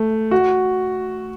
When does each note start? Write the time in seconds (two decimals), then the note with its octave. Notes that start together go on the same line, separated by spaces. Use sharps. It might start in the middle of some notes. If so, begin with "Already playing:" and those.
Already playing: A3
0.31 F#4